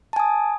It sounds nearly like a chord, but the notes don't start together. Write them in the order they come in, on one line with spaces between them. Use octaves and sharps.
A5 G#5 D#6